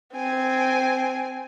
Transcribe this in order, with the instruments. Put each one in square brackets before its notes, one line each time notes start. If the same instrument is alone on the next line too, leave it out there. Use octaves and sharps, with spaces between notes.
[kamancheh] C4 G#5